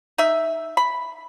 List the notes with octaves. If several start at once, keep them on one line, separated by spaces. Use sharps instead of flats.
D#4 E5
B5